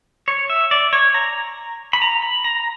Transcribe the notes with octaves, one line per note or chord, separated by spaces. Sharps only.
C#5
E5
D5
C#5
A#5
B5
A#5
B5
A#5